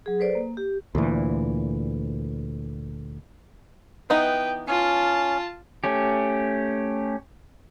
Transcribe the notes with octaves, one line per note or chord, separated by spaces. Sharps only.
F#3 G#4
A4 B4 C5 D5
A#3
G4
D2 A#2 E3
E3 B3 D#4 B4 G5
C#4 F4 A5
A3 C#4 G4